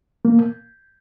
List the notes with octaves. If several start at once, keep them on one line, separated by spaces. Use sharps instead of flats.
A#3